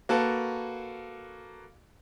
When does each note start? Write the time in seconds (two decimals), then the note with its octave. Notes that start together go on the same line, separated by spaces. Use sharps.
0.09 A#3 F#4 A4 B4 A5